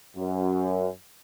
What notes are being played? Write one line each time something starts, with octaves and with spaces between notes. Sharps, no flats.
F#2